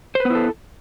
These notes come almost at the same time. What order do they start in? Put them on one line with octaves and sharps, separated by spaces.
C5 B4 B3 E4 A4